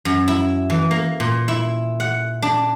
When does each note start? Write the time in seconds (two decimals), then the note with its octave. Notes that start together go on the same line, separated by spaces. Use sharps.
0.05 F#2
0.28 E4
0.70 E3
0.91 A#3
1.20 A#2
1.48 E4
2.00 F#5
2.42 D4